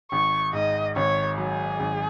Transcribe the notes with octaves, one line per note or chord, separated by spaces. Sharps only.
G#1 C#6
G#2 D#5
G#1 C#5
F#3 G#4
G#1